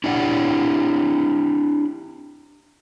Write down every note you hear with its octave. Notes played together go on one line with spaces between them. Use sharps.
D4 E4 G4 D5 F#5